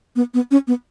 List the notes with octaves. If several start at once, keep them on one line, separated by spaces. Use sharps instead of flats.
B3
B3
C#4
B3